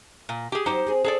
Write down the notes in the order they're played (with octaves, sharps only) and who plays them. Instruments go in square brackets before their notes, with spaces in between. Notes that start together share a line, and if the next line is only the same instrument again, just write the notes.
[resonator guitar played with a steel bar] A#2
G4 G#4
[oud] F#3 C4 [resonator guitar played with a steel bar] D#4 G4 C5
[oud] C4 G#4
[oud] C4 [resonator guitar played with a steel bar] G#4 A4 D5